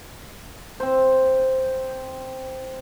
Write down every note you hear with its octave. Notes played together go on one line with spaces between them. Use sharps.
C4 C5